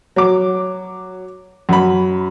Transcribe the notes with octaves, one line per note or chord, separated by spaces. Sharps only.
F#3 D6
F#2 B5